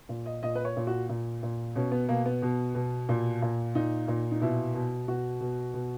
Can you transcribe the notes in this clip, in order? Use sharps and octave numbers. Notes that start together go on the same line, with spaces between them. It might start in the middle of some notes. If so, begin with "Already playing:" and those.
A#2
D#5
A#2 D#5
B4
C#5
A#2
F#4
A#2
A#2
B2 C#4
B3
B2 A#3
B3
B2
B2
A#2
A#2
A#2 D#4
A#2
D#4
B2 E4
B2
B2 F#4
B2
B2